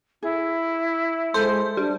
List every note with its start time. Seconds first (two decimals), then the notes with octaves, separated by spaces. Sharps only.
0.23 E4 G#4
1.34 G#3 A4 C5
1.77 G3 D4